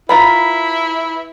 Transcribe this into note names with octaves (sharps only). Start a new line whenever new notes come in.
E4 F4 A#4 B4 B5 B6